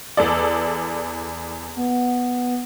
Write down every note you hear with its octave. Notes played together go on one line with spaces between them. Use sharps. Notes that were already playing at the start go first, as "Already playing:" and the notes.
E2 A4 D5
B3